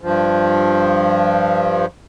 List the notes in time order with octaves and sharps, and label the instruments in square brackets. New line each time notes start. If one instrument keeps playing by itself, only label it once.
[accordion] G2 F3